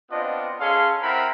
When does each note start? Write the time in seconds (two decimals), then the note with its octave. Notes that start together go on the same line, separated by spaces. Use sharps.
0.11 B3 C4 D4 F4 D#5
0.60 C#4 G#4 A4 F5 C6
1.03 C4 E4 A#4 F#5 B5